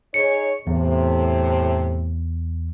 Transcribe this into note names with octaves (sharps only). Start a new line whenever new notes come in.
D#4 G#4 C#5 C#7
E2 A2 C3